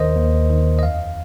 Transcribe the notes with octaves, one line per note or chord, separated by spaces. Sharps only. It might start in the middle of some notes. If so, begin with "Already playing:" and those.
Already playing: D#2 D#3 A#4 C5 D#5
D#2
D#3
D#5
F2 F5